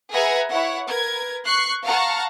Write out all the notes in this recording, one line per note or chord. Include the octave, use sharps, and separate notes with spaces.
G#4 B4 E5 F#5 G#5 A#5
E4 C#5 F#5
A#4 B4 G#6
C#6 F#6 C7
F5 F#5 A5 A#5 C#6 F6